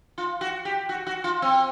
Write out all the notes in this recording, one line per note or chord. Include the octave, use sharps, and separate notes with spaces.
F4
F#4
G4
F#4
F#4
F4
C4